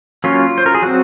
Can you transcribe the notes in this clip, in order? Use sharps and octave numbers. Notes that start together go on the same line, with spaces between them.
F#3 A#3 C#4 F4
C5
A#4
G#4
F#3 C4 F#4